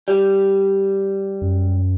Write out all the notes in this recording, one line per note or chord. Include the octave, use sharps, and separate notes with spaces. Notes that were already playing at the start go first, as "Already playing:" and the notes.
G3
F#2